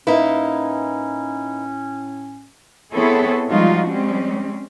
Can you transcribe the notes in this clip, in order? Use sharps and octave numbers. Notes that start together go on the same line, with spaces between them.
A2 A#3 C#4 D#4 E4 B4
B3 C4 E4 G#4 A4 C#5
F3 G3 G#3 D#4 F4 F#4
G3 G#3 C4 C#4